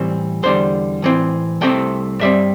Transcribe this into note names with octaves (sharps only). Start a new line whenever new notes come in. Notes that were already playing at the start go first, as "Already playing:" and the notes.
Already playing: A2 E3 G3 C4
E2 D3 G3 C5
A2 E3 C4
C2 C3 A3 C4 G5
G2 G3 C4 E5